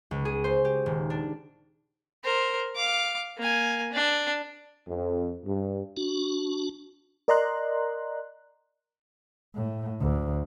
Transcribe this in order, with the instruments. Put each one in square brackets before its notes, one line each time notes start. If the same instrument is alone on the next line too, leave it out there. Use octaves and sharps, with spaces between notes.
[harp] C#2
G#4
C5
G4
D#1
D4
[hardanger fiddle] A#4 C5
F5 D6
A#3 G#5
D4
[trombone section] F2
G2
[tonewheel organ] D4 F#4
[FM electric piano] A#4 D5 D#5 A#5 C6 F#6
[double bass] A2
D2